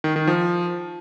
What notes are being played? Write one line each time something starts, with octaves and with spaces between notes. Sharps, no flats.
D#3
D#3
F3